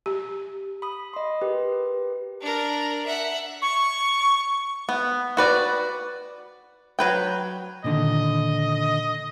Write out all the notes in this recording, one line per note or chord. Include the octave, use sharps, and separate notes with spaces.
G4
B5 D#6
D#5 C6
G4 A#4 B4
D4 A#4
E5 F#5
C#6
B3
F#4 B4 D5
F#3 B4 G5
A#2 D3 D#3 D#5